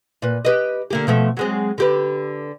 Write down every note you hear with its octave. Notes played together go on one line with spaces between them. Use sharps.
A#2 B4
G4 B4 D#5
D3 A#3 G4
B2 F3 A3
F#3 G#3 C4
D3 G4 B4